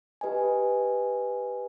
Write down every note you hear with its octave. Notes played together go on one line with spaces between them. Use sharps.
G4 B4 D#5 G#5